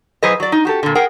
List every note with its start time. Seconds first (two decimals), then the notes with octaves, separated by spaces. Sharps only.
0.23 F#3 E4 G#4 B4 C5 D#5
0.40 F#3 D5
0.52 D#4
0.65 F#4 G4 A4
0.83 A#2 D3
0.95 G#4 A#4 F#5 G5